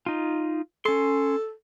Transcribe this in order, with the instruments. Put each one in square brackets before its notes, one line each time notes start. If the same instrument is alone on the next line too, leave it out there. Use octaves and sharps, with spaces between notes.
[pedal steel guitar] D#4 F4
[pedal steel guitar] C#4 C6 [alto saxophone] A4